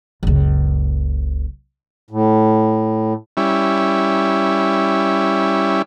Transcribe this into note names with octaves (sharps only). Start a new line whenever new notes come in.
F#1 C#2
A2
G3 C#4 E4